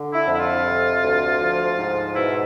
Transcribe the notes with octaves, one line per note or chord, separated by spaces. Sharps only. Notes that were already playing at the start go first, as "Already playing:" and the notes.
Already playing: D3
E4
F2
E4
F4
C3
D2
F3
G#2
B2 E4